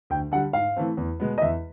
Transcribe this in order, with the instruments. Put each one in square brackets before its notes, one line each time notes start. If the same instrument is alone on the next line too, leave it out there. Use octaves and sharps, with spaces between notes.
[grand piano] D2 [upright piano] G5
[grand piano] D3 G3 [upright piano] F#5
[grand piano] G#2 [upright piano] F5
[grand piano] E3 A3 C4
E2
B2 G#3 B3
[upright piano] D#5
[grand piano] E2 [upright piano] E5